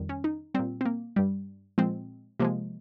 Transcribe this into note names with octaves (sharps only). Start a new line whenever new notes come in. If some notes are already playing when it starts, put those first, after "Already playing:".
Already playing: F2 D#3 G3
C#4
D#4
A#2 G3 C4
C4
A#3
G2 G3
A#2 F3 G#3 C4
C3 F3 G#3 A#3